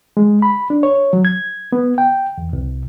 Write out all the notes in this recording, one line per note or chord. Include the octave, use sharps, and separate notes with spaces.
G#3
B5
D4
C#5
F#3
G#6
B3
G5
E2
C2